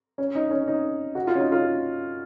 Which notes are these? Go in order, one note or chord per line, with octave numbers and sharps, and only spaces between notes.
C#4
D#4
C#4
D#4
F#4
F4
C#4
D#4
F4